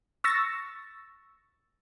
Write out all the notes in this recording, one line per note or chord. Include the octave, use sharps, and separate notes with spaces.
C#6 E6 A6 A#6